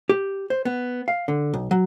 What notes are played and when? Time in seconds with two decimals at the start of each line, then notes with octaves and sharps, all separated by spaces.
0.09 G4
0.50 C5
0.65 B3
1.08 F5
1.28 D3
1.54 B1
1.71 F#3